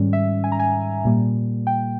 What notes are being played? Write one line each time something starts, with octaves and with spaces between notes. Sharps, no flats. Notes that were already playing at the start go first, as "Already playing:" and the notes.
Already playing: G#2 D#3 G3 C#4
E5
G#5
A#5
G#5
A#2 G3 A#3
G5